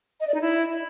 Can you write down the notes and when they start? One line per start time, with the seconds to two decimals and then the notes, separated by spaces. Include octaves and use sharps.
0.20 D#5
0.27 D5
0.34 D#4
0.41 E4